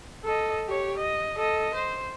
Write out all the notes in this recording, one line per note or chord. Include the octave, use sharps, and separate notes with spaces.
A4 D#5
G4 C#5
D#5
A4 D#5
C5